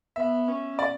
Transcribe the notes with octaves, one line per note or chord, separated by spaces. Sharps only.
B3 E5
C#4
D5